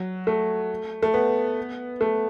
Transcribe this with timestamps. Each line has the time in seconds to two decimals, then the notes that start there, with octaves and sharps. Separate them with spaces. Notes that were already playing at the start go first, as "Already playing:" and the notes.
Already playing: F#3
0.27 A3
1.02 A3
1.14 B3
2.01 A3